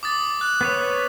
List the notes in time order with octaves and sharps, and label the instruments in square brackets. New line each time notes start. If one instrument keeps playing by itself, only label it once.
[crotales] D6 D#6 A6
F#6
[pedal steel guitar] B3 B4 C#5